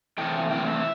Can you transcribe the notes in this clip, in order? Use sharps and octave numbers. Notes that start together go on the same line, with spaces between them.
C3 E3 A3 G5
C3 E3 A3 G5
E5